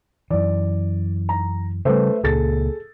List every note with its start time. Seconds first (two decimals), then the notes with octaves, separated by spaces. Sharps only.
0.30 F#2 E3 D5
1.29 A#5
1.85 C#3 G3 A3 B4 C5
2.23 C#2 A#2 G#4 A4 A6